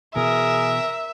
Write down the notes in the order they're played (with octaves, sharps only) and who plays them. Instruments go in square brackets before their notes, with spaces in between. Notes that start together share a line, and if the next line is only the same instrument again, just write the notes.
[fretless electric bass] B2 E3 [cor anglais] G#4 [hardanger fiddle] A#4 [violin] E5